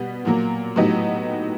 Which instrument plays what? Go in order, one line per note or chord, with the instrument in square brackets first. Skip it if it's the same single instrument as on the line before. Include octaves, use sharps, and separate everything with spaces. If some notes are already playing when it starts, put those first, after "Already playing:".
Already playing: [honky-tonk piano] B2 G3 B3
A#2 F#3 A#3
A2 F#3 B3 D#4 G4